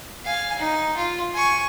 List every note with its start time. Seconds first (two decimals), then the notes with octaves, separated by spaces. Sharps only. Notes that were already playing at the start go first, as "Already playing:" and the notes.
0.25 F5 G#5
0.59 D#4
0.97 F4
1.35 G#5 C#6